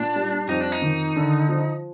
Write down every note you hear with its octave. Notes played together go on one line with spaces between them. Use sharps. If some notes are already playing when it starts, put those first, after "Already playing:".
Already playing: A#2 D4
G3
F2 D#4
D4
D#4
D#3
D3
F3